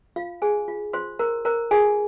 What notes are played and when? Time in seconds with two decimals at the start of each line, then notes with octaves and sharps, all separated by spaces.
0.16 F4 F5
0.42 G#4 C5 G#5
0.68 F4
0.93 F4 C5 C6
1.19 A#4 C5 A#5
1.45 A#4 C5 A#5
1.71 F4 G#4 G#5